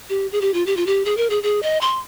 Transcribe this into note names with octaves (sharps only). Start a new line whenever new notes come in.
G4
G#4
G4
F4
G4
F4
G4
G#4
A#4
G#4
G#4
D#5
C6